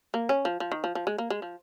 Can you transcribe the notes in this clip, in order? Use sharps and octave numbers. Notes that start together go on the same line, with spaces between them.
A#3
C#4
F3
F3
D#3
F3
F3
G#3
A#3
G#3
F3